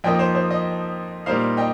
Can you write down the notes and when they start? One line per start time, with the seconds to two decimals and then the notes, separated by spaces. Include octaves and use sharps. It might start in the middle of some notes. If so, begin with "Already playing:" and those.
0.04 F2 F3 A#3 D#4 D#5 G5
0.19 C5
0.35 C5
0.51 D#5
1.26 A#2 G3 A#3 D#4 C5 F5
1.57 D#5 G5